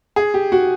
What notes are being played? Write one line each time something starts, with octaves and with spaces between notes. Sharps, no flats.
G#4
G4
F#4